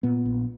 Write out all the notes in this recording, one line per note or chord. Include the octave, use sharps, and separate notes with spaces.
A#2 B3
A#1